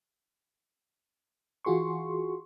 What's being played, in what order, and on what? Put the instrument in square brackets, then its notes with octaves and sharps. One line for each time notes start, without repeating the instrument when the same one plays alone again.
[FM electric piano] E3 F4 F#4 G#4 C6 C#6